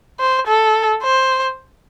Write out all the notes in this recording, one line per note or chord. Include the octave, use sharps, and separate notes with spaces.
C5
A4
C5